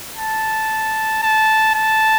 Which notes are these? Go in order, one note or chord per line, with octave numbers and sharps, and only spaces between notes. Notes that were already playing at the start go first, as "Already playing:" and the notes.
A5
A5
A5